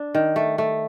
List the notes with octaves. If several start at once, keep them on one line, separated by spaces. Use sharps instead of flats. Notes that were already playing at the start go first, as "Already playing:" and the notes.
Already playing: D4
D#3
A3
A3